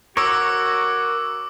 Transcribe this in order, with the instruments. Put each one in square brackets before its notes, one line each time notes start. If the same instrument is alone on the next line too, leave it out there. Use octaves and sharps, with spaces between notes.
[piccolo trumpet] F#4 [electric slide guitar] A#4 C#5 [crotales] D6 E6